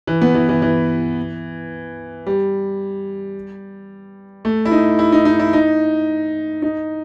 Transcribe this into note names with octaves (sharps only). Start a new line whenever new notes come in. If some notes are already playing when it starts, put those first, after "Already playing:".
E3
B3
E3
E3
E3
G3
A3
E4
D#4
E4
D#4
D#4
E4
D#4
D#4